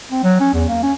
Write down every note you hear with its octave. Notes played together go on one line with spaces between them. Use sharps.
C4
F#3
C#4
E2
A#3
C#4